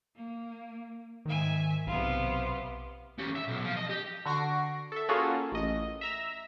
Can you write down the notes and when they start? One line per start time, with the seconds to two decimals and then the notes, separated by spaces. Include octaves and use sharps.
0.14 A#3
1.25 G#2 D#3 E5 G#5
1.87 B1 C3 B3 F4
3.18 C#4 G4
3.36 E5
3.48 B1
3.64 F3
3.77 D#5
3.90 G4
4.26 D3 F#4 C#6 A#6 C7 D7
4.92 A4 E5
5.09 A#3 C#4 F4 F#4 G#4 A4
5.52 A1 D#5
6.01 E5 A#5 E6